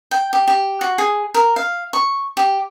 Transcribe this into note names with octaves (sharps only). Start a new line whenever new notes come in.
G5
G4
G4
F#4
G#4
A#4
F5
C#6
G4